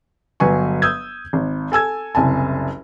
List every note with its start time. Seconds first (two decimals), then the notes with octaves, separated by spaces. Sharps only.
0.40 G1 F#3 B4 G#5 C#6
0.82 D#6 E6 G6 G#6
1.33 G#1
1.72 A4 G#5 E6 G#6
2.15 F#1 C2 G#5 A5